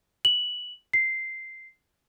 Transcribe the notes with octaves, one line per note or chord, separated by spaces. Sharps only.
F#7
C7